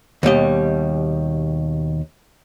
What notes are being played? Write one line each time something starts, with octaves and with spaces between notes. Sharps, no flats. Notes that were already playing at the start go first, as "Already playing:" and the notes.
D#2 B2 G3 D#5